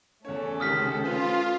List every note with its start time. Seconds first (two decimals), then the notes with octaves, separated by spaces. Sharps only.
0.25 E2 A3 C#4 A4 C#5
0.60 C#2 C3 D#3 D#6 F6 B6
1.04 F4 B4 C5